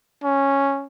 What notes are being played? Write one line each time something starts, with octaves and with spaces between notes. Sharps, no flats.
C#4